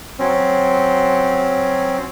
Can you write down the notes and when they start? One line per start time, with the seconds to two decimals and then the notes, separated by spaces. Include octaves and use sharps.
0.19 F#3 C4 C#4